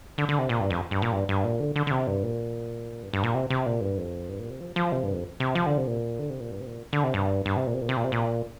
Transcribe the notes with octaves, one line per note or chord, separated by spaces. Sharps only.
D3
D3
C3
A#2
G2
F2
G2
A#2
G2
G2
A#2
D3
D3
D3
C3
G2
A#2
G2
G2
A#2
C3
C3
A#2
G2
F2
G2
A#2
C3
F3
F3
C3
G2
F2
C3
F3
D3
C3
A#2
D3
C3
A#2
G2
C3
A#2
D3
C3
G2
G2
C3
A#2
C3
A#2
C3
A#2
C3
A#2